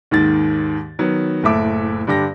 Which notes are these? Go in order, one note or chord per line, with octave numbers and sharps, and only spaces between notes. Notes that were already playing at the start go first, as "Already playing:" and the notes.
D#2 G#2 D#3 A6
D#3 F#3 B3
F#1 A2 A3 E5 D6
G2 D3 G4 A#6